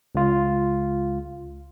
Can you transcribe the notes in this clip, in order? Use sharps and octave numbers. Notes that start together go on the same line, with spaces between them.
C#2 F4